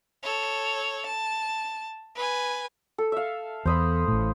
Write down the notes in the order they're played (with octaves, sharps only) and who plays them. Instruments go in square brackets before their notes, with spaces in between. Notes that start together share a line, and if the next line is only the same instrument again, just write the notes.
[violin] A4 C#5
A5
B4 G#5
[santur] A4
E5 F5
[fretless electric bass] E2 [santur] C5 D#5 B5
[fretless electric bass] A1 A2